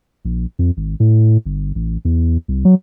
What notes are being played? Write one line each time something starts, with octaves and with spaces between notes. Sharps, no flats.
A#1
F2
G#1
A2
G1
A1
E2
C2
F#3